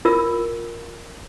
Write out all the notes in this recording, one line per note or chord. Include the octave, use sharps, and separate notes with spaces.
F4 A#4 E6